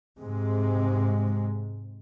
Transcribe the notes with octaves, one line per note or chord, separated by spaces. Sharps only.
G#2 C3 G#3